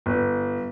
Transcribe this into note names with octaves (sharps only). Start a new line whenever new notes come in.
G1